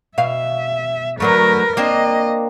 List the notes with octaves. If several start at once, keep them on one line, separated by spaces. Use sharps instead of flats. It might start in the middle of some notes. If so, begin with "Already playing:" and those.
B2 E5 F5
D3 F#3 A3 A#4 B4
A#3 C4 D4 D#5